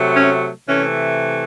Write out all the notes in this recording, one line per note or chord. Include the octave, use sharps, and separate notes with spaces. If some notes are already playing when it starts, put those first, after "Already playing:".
Already playing: C3 F#3 A3
C#4
C3 E3 A3 C#4